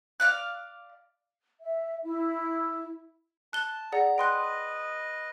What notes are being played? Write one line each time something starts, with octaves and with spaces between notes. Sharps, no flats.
D5 F5 F#6
E5
E4
A5 F#6 G7
G#4 D5 F#5 A#5
B4 D#5 G5 C6 F#6